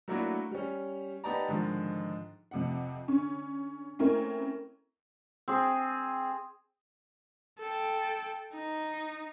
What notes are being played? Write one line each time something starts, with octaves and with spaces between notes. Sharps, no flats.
F#3 A3 A#3 D4 E4 F#4
G3 C#4
B3 D#4 G4 D5 A5 A#5
G#2 D3 D#3 F3
F2 C3 F#5
D3 C#4
A3 A#3 C4 C#4 E4 A#4
C4 G#4
A4 G5
D#4